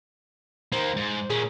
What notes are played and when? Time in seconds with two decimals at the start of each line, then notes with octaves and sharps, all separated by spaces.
0.72 D#3 A#3 C5
0.97 G#2
1.30 A#2 C#4 G#4